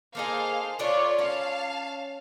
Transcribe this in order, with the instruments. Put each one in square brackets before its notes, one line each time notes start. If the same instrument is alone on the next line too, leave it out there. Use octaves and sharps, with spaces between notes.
[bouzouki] A#3 D#4 G#4 [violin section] A4 C5 F5
[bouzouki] A3 D4 D5 [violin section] F4 C#5 B5
[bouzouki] C#4 [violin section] F5 A5